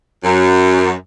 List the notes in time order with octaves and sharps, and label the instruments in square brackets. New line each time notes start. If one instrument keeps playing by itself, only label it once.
[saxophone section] F#2